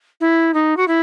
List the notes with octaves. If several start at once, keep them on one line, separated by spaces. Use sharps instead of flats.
E4
D#4
F#4
E4